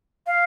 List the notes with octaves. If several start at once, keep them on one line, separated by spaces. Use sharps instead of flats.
F5